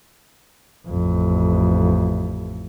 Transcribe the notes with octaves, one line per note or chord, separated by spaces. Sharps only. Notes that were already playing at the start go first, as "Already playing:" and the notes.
A1 F2